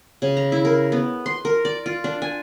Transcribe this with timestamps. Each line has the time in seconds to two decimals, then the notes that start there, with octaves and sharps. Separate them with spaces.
0.22 C#3
0.37 A#5
0.52 E4
0.65 A#4
0.92 B3
1.26 C6
1.45 A#4
1.65 D5
1.86 F4
2.04 D4
2.22 G#5